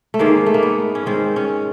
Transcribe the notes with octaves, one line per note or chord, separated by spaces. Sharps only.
A3
G#2 D#3 G#3 A#3
A3
A#3
B3
C#4
G#2 D#3 G#3 C4
C#4